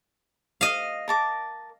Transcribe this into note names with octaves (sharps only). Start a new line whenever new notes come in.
D#5 F5
A#4 A5 D6